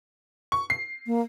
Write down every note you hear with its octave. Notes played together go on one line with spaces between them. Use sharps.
C#6
C7
A#3